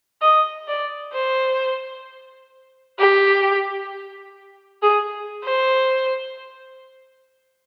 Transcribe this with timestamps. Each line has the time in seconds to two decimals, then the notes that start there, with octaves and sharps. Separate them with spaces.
0.22 D#5
0.68 D5
1.14 C5
2.98 G4
4.82 G#4
5.44 C5